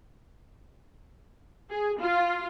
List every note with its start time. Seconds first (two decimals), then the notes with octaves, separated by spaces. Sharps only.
1.70 G#4
2.00 F4